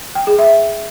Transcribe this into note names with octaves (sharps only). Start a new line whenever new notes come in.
G5
G#4
E5